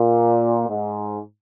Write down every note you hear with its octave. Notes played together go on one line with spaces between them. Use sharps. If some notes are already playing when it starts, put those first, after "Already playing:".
Already playing: A#2
G#2